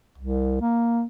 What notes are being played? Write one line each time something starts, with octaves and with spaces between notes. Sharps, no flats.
C2
A#3